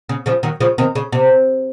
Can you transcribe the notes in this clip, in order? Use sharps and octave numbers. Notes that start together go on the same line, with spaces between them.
C#3
C#3 F3
D#3 F#3
C#3 F3
C3 D#3
C#3
C3